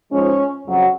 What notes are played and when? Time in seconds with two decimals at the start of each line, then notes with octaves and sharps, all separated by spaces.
0.11 G#2 F3 G#3 C#4 C#5
0.66 F2 C#3 F#3